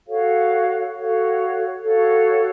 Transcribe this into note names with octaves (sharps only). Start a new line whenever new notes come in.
F#4 A4 C#5 F5
F#4 A4 C#5 F5
F#4 A4 C#5 F5